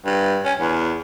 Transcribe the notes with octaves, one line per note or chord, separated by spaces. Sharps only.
G2
C#4
E2